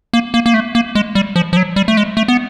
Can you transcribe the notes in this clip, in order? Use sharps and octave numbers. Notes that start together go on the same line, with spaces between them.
A#3
A#3
A#3
A3
A#3
G#3
G3
F3
F3
F#3
G3
A3
G#3
A3
B3